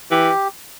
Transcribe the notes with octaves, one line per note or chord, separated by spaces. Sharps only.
E3 G4